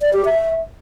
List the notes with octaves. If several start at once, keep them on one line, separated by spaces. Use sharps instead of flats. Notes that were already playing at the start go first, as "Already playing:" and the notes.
D5
G4
E5